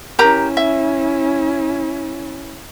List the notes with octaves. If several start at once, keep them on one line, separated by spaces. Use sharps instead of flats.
C#4 E4 G4 A#4 A#5
E5